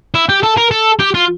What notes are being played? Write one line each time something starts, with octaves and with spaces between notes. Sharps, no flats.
E4
G4
A4
A#4
A4
G4
F4